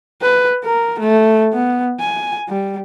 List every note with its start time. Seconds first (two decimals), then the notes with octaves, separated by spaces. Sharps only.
0.21 B4
0.64 A#4
0.99 A3
1.53 B3
2.00 G#5
2.48 G3